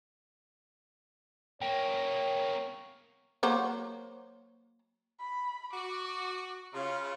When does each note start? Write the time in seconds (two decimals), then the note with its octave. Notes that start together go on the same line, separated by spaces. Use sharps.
1.62 A#3 C#4 C#5 G5
3.43 F#3 A#3 C5
5.20 B5
5.74 F#4 D6
6.73 C#3 F4